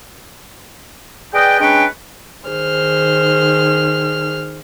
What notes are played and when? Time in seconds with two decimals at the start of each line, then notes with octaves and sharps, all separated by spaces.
1.34 G#4 B4 D5 D#5 G5
1.60 G#3 C#4 D4 B4 C#5 G5
2.47 D#3 G#4 C5 F6